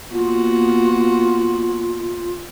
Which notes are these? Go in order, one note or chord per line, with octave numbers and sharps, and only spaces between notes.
A#3 B3 F4 F#4